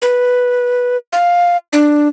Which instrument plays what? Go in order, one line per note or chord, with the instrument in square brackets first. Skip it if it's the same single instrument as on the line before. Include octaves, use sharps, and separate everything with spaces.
[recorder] B4
F5
D4